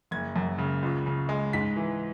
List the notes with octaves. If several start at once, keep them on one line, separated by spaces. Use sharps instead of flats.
F#1 G#6
F#2
C#3
C#2
C#3
G#3
G#2 B6
E3